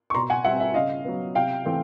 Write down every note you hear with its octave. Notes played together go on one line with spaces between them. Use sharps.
C#6
B2 A#5 C6
F#5 G#5
G3 C4 E5 F#5
E5
C#3 D#5 F5
F#3 B3
C3 F5 G5
E3 A3 C4